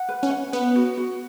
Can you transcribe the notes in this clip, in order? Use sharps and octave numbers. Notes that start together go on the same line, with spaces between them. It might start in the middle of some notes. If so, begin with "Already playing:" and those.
Already playing: F#5
B4
C#4
F#5
B3 B4
F#4
F#4